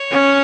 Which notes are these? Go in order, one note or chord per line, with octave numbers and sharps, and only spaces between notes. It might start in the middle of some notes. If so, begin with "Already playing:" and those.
Already playing: C#5
C#4